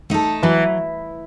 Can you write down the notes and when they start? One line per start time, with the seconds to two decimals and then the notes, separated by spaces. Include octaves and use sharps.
0.10 A3 D#4 A4
0.43 E3 F#3